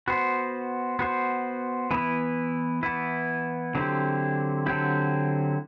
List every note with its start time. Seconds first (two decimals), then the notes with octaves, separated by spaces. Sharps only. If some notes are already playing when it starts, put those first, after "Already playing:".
0.08 B3 F#4 C5
0.99 B3 F#4 C5
1.91 E3 B3 E4 B4
2.83 E3 B3 E4 B4
3.75 D3 F#3 C4 E4 G4
4.66 D3 F#3 C4 E4 G4